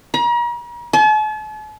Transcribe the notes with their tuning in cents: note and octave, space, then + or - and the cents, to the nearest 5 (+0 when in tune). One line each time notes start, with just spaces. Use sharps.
A#5 +40
A5 -45